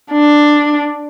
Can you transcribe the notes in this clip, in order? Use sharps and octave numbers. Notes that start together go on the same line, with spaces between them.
D4